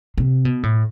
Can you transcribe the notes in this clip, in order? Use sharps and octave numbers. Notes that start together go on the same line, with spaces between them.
C3
B2
A2